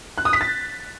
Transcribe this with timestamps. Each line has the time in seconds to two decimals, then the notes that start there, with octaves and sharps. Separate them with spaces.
0.18 F#6
0.25 D#6
0.33 B6
0.41 A6